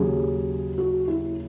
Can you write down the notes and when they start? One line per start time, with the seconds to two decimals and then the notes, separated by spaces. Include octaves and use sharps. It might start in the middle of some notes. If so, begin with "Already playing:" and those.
Already playing: D#2 C#3 F#3 G#4
0.78 F#4
1.08 E4